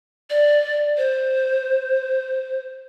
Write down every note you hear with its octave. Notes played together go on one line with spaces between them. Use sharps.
D5
C5